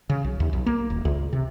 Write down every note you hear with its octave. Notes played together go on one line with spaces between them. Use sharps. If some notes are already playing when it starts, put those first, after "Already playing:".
C#3
B1
D#2
B1
A#3
D#1
C#2
C3